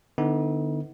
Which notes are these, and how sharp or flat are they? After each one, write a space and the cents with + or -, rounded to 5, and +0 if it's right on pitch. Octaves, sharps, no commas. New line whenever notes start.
D3 +25 B3 +10 D#4 +45